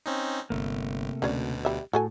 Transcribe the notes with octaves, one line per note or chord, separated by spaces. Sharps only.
C4 C#4 D#4
G1 C3 A3 A#3
D2 B2 F#3 C#4 D5
G3 E5
A2 F#4 A4 G#5